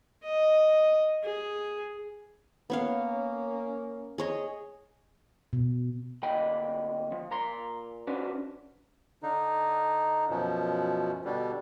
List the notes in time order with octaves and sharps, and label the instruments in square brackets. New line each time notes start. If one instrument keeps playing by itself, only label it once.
[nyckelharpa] D#5
G#4
[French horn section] A#3 C#4 [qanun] B3 C#5 F5
[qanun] G#4 C#5 D#5
[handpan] B2
[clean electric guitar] D2 A#2 D#5 G5 B5
F3
A#2 A#5 C6
C#4 D4 F#4 B4 C5 D5
[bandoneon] D3 D#4
F#2 B2 F3
B2 D3 G3